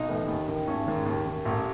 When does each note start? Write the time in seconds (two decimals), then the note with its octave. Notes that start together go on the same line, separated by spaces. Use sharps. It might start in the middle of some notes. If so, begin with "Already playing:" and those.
Already playing: B1 D#4
0.08 A2 E3
0.28 D#2
0.48 D#3
0.67 G#1 C#4
0.86 G#2 D#3
1.06 D#2
1.26 D#3
1.45 A1